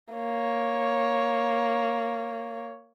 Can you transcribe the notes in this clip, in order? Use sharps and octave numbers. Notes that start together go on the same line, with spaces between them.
A#3 C#5